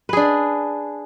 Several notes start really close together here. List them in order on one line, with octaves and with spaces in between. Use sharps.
B4 G#4 D4